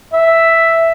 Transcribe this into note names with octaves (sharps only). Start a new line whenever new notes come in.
E5